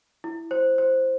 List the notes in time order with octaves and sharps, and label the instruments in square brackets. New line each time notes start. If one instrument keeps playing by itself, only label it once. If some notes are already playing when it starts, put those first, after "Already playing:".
[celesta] E4
C5
C5